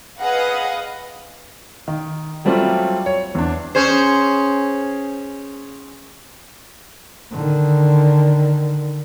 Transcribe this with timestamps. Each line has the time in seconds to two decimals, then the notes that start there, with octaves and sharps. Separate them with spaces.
0.20 G#4 B4 D#5 F5 F#5
1.88 D#3
2.45 F#3 G3 A3 C4 F4 G4
3.06 C#5
3.35 E2 D4
3.75 C#4 G#4 C5
7.32 D3 D#3